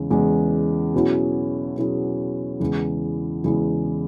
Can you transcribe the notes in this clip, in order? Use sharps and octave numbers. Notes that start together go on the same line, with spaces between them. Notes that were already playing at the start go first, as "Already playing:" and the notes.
Already playing: E2 C#3 G#3
E2 C#3 G#3
B2 F#3 C#4 E4 G#4
B2 F#3 C#4 E4 G#4
E2 C#3 G#3 E4 G#4
E2 C#3 G#3 E4 G#4